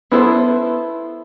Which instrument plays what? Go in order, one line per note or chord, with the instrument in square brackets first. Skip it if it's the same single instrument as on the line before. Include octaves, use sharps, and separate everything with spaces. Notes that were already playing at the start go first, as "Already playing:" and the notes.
[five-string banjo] B3 E4 A4 C5